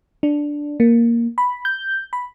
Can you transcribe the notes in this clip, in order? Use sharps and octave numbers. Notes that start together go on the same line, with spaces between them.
D4
A#3
B5
G6
B5